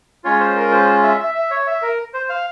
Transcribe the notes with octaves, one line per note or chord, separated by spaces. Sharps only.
G#3 C#4 F4 C#5
C5
A#4
C5
E5
E5
E5
C#5
E5
A#4
C5
F5